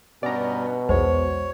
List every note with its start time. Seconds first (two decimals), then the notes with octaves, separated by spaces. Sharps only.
0.23 G2 B2 B3 C#4 D5 A#5
0.89 B1 E2 G#3 C5 C#5